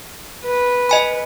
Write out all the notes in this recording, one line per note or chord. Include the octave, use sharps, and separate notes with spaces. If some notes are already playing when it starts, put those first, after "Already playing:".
B4
D#5 G#5 B5